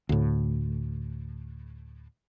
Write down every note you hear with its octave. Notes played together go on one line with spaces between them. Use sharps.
D2 A2